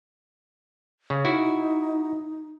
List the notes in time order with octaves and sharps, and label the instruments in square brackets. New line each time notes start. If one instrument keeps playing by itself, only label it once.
[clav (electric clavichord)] C#3
[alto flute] D#4 [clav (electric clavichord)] E4 F#4